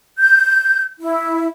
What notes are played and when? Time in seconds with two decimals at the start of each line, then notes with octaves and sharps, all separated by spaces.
0.18 G6
1.00 E4